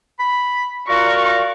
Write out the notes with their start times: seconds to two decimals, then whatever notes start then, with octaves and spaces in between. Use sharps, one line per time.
0.19 B5
0.89 F4 F#4 A#4 D5 C#6